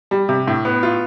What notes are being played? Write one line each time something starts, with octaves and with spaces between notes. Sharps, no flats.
G3
C3
A2
B3
F4